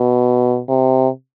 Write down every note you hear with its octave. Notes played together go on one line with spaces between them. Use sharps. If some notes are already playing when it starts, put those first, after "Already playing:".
Already playing: B2
C3